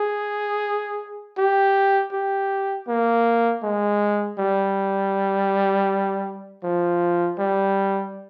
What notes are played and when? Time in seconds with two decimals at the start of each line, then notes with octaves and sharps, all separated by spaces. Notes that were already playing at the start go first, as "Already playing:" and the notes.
Already playing: G#4
1.38 G4
2.13 G4
2.88 A#3
3.63 G#3
4.38 G3
6.64 F3
7.39 G3